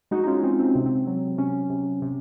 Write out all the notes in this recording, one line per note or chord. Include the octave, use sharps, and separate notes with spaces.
G#3 D#4 F#4
D#4
C#4 F4
G#3 C4 D#4
C4
C3
C4
F#3
C3 C#4
C3
C3